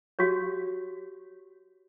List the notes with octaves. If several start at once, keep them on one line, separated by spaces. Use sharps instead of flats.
F#4 G4 C#5